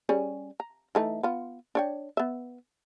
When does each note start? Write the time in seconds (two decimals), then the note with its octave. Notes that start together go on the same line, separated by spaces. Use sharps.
0.09 G3 C#4 G#4
0.60 A#5
0.95 E3 A3 D#4
1.23 B3 F4
1.75 D4 C#5 G5
2.17 B3 E5